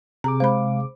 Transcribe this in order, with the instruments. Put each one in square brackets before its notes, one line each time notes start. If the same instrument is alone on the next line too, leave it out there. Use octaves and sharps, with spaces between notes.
[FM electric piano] C3 G#4 D6 [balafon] A#5
[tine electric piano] G#3 F5 [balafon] C5 B5